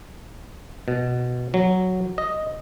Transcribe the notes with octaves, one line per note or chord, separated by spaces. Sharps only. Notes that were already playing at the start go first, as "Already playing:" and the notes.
B2
F#3
D#5